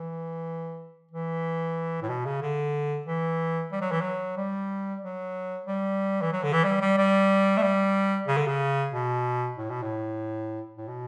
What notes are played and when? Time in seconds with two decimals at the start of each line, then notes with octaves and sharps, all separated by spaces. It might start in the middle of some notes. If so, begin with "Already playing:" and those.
Already playing: E3
1.11 E3
2.02 A2
2.09 B2
2.25 C#3
2.42 D3
3.06 E3
3.72 G3
3.81 F#3
3.91 E3
4.01 F#3
4.37 G3
5.02 F#3
5.66 G3
6.22 E3
6.32 F#3
6.43 D3
6.53 E3
6.64 G3
6.81 G3
6.98 G3
7.57 A3
7.62 G3
8.27 C#3
8.37 D3
8.47 C#3
8.92 B2
9.57 A2
9.70 B2
9.82 A2
10.77 A2
10.88 B2